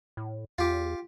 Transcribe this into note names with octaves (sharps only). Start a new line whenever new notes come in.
A2
E2 F4 G4